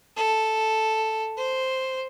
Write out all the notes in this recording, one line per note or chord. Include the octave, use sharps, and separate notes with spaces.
A4
C5